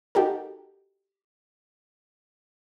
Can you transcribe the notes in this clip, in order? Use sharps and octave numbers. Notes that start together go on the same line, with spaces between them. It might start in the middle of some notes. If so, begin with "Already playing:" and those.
D#4 F#4 G4 A4 A#4